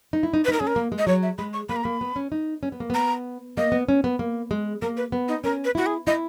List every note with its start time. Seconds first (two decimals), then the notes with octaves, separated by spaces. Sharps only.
0.13 D#4
0.23 E4
0.34 D#4
0.45 B4
0.48 D#4 A#4
0.60 C#4 G#4
0.67 A#4
0.76 A#3
0.92 G#3
0.98 D#5
1.07 F#3 C#5
1.23 E5
1.38 G#3 B5
1.53 C#6
1.69 A#3 B5
1.76 A#5
1.84 A#3 B5
2.01 B3
2.16 C#4
2.32 D#4
2.63 C#4
2.72 B3
2.80 A#3
2.90 B3 A#5
3.57 A#3 D#5
3.72 B3
3.88 C#4
4.04 B3
4.19 A#3
4.51 G#3
4.82 A#3 A#4
4.97 B4
5.12 B3
5.28 D#4
5.44 C#4 A#4
5.65 B4
5.75 E4 F#4
5.86 G#4
6.07 E4 D#5